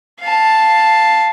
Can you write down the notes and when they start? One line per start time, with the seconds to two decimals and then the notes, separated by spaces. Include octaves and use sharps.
0.21 F5 A5